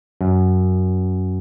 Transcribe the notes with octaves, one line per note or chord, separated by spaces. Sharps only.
F#2